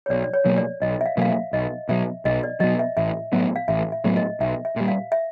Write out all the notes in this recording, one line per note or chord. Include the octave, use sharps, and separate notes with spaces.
C#5
B1 D5
D5
C#5
B2 F#3 A#3
D5
B1 D#5
E5
F5
B2 F#3 A#3 F5
E5
B1 D#5
B2 F#3 E5
B1 D#5
D5
B2 F#3 D#5
E5
A1 E5
A2 F#3 B3
F5
A1 E5
E5
A2 F#3 B3
D#5
B1 E5
E5
A#2 G3
F5
E5